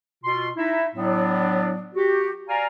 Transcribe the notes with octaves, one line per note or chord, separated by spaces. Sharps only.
B2 F4 C6
D#4 E4 E5
A2 F#3 B3 D4
F#4 G4
D5 F5 G#5 A#5